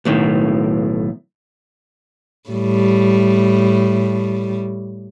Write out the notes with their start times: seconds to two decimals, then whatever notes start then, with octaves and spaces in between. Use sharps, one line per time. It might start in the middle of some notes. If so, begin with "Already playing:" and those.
0.05 B1 A2 D#3
2.50 A2 G3